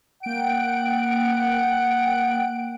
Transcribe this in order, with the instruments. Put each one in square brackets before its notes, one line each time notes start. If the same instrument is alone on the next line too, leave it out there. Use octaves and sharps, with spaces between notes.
[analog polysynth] A#3 G5 D7 [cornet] F#5